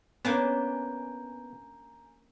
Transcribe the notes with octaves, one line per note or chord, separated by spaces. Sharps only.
A#3 B3 C#4 D4 G#5 A#5 G6